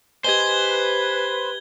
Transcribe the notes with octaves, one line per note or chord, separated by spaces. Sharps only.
G4 B4 C5 D#5 G#5 G#6 G7